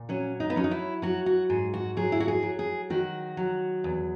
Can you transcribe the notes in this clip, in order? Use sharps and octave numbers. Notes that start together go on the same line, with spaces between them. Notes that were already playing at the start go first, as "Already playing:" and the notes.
Already playing: A#2
F#3 C#4
D#4
B3
F#3 C#4
D#4
E4
F#3 F#4
F#4
G#2 G#4
F#4
F#3 G#4
E4
F#4
G#4
F#3
G#4
D#3 F#4
F#3
E2